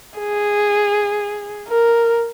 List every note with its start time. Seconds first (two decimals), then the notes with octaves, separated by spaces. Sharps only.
0.19 G#4
1.68 A#4